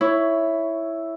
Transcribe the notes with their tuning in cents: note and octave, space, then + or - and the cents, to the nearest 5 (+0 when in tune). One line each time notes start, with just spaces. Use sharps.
E4 +0 C#5 +0 C#6 +15